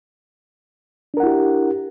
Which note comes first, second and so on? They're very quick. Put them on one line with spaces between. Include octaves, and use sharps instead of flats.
D4 A#4 F#5 E4 G4